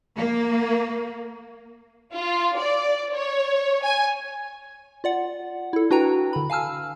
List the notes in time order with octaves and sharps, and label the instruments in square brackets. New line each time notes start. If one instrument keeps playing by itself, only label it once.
[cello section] A#3
[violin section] F4
D5
C#5
G#5
[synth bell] F4 D5 F#5
E4 A4
D4 F#4 B4 G5 A#5
D3 B5
F5 G#5 A5 E6 F6